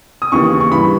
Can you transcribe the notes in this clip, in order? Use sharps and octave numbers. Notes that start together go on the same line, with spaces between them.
D#6
D#2 C#3 E3 C#6
C#6
G2 E3 B5